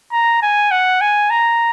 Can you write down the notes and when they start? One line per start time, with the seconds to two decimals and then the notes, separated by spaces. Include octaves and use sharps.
0.12 A#5
0.42 G#5
0.71 F#5
1.01 G#5
1.30 A#5